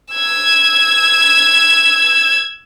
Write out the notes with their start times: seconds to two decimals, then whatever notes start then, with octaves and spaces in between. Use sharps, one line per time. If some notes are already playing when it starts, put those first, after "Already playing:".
0.13 E6 G#6